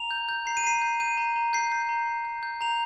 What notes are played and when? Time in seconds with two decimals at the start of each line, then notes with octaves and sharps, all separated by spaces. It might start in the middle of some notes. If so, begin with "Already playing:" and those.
Already playing: A#5 F7
0.11 G6
0.29 G6
0.46 A#5 C7
0.57 D#7
0.64 A#5 C7
0.81 G6
1.00 G6 D#7
1.17 A#5
1.36 A#5
1.53 G6 C7
1.72 G6
1.89 A#5
2.08 A#5
2.25 G6
2.43 G6
2.61 A#5 F7